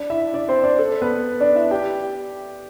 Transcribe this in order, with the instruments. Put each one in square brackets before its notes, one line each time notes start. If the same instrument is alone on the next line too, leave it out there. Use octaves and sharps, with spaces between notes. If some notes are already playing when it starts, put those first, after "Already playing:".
Already playing: [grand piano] D4 D5
E4 E5
D4 D5
C4 C5
D4 D5
A4
B3 B4
D4 D5
E4 E5
G4 G5